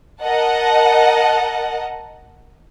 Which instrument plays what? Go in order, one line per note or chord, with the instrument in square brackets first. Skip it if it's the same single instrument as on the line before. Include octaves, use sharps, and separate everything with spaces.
[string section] A#4 D#5 F#5 A5